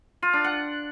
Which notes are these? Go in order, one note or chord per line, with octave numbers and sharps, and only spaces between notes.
F4
D4
F#5